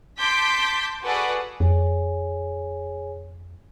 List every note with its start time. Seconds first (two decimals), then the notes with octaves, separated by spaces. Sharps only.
0.18 A5 C6 D6 G6 B6
1.04 F#4 G#4 A4 B4 D5 F#5
1.60 F2 G#4 C#5 G#5